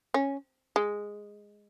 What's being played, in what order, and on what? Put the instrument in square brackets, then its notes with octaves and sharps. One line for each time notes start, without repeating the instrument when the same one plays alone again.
[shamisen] C#4
G#3